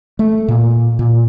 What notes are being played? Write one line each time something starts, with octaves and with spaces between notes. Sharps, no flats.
A3
A#2
A#2